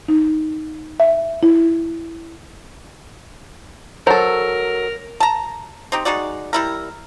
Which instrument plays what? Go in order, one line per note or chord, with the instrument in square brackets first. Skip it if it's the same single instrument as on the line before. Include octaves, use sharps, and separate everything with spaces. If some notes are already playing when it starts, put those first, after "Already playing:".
[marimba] D#4
E5
E4
[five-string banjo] F#3 A4 [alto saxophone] A#4 [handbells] C5 A#5
[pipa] A5 A#5
C4 D#4 G4
G#3 D#4 F#4 D5
G3 E4 A#4